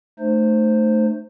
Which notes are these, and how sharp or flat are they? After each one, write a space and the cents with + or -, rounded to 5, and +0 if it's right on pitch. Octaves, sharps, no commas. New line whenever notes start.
A3 +0 D#4 -40 C5 +0